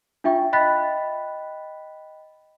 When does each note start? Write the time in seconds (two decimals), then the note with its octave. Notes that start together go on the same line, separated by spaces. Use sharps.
0.24 D4 F4 E5 G5 C#6
0.53 D#5 G5 B5 F#6 A6 B6